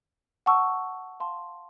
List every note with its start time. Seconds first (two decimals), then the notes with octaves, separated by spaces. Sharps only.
0.46 F#5 A5 C#6 E6
1.20 F5 A5 C6